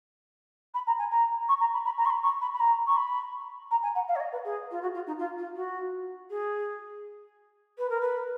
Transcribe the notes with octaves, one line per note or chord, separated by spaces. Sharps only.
B5
A#5
G#5
A#5
C#6
A#5
B5
B5
A#5
C#6
B5
C#6
B5
B5
A#5
C#6
B5
A#5
G#5
F#5
F5
C#5
D#5
B4
G#4
F4
F#4
F4
D#4
F4
F4
F#4
G#4
B4
A#4
B4